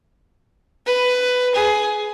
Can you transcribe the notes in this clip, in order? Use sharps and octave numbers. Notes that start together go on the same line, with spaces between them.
B4
G#4